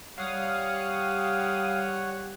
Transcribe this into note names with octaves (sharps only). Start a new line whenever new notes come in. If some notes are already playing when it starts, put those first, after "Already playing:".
G3 G4 C#5 F5 F#5 D#6